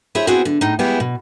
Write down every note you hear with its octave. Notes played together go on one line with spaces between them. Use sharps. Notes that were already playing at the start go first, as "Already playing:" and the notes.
E4 G#4 C5 C#5 E5
B3 C4 E4 F#4 G#4
D3
A2 D#4
G3 G#3 B3 E4 G4 G#4
B2